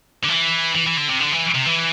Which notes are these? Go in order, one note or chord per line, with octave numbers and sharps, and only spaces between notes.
D3
E3
E3
E3
D3
C3
D3
E3
C3
E3